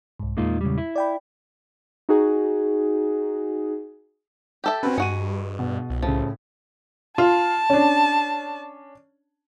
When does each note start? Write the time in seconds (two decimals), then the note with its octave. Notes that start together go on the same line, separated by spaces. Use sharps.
0.20 C2 G#2
0.37 E2 A#2 G#3 A#3 D#4 F4
0.61 C#3 G3
0.77 E4
0.96 D5 G5 B5
2.09 D#4 F#4 G#4
4.64 G4 A4 E5
4.83 C4 C#4 F#4 B4
4.98 G2 G#3 F#4 C#7 D#7
5.59 B2
5.90 C2
6.02 A2 C#3 F3
7.18 F4 A5
7.70 C#4 D4